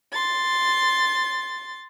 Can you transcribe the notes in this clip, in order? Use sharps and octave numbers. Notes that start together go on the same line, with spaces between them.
C6 A6